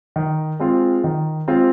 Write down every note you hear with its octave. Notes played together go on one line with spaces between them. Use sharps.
D#3
G#3 C4 F4
D#3
G#3 C4 F4